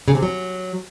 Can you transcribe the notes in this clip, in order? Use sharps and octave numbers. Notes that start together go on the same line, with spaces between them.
C#3
C3
F#3